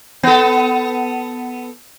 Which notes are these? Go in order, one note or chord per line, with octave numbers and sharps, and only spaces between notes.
B3 A4